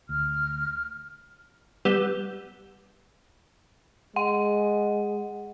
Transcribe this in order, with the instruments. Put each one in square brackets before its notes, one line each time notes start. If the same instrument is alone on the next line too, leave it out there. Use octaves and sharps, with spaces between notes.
[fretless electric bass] D2 [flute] F6
[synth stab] G3 B3 E6 G6
[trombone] G#3 [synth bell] F#5